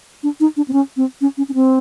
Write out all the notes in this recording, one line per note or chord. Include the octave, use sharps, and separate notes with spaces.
D4
D#4
D4
C4
C#4
C4
C#4
C#4
C#4
C4